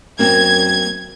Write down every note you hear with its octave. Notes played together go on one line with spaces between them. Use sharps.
F#2 A#3 C4 G#6